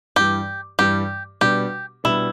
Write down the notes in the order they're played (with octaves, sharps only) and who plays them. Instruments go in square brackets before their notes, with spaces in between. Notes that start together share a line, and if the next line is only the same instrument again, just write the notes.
[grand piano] G2 E3 G3 [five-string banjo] G4
[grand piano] G2 E3 G3 [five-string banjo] G4
[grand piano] B2 G3 B3 D4 [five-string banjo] G4
[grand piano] B2 G3 B3 D4 [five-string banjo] E4